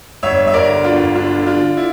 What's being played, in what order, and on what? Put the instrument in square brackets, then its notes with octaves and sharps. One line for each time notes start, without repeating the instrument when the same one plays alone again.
[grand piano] G1 C#5 E5
G1 E5
A#4 D5
D3
D4 F4
G1
D3 D4 F4
D3
D4 F4
D3
E4